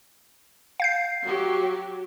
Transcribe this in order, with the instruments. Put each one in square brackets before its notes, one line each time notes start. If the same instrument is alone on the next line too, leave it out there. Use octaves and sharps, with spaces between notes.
[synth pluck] F5 G6 C7
[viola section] F#3 F#4 G4